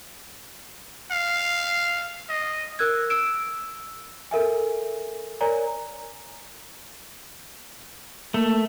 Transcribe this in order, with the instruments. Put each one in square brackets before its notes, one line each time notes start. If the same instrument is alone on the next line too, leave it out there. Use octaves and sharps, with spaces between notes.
[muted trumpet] F5
D#5
[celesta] A#4 E6 F#6 G#6
E6 D7 E7
A4 A#4 E5 G#5
A#4 C#5 D5 G#5 A#5
[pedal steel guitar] A3 [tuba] A#3